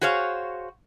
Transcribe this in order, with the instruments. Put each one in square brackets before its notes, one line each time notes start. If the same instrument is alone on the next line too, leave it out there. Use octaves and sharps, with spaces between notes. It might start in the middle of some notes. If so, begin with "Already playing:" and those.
[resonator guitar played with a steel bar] F#4 G#4 C5 C#5 F5